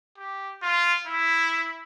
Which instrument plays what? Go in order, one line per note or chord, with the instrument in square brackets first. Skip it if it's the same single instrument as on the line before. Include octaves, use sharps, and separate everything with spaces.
[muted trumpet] G4
F4
E4